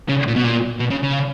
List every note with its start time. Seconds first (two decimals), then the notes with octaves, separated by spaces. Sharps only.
0.09 C#3
0.27 A#2
0.36 B2
0.44 A#2
0.79 B2
0.91 C#3
1.03 C#3